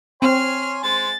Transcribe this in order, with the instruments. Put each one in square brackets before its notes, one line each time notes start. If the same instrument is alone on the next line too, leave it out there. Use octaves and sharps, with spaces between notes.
[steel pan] C4 [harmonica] C#5 G#5 C6 [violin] F6 C7
[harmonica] G#3 C5 G#5 [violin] A6